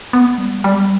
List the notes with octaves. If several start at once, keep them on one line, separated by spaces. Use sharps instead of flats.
B3
G3
G3